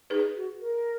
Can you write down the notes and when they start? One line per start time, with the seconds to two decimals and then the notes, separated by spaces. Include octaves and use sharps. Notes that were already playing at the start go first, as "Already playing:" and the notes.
0.10 D#4 G#4 B4
0.36 F#4
0.61 A#4